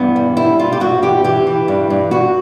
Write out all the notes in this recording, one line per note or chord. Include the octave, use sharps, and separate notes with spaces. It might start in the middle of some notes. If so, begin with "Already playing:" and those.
Already playing: G2 E3 B3
G3
G3 E4
G2 F4
G4
G2 F#4
E3 G4
E3 G4
E3
G2
G2
G2 F#4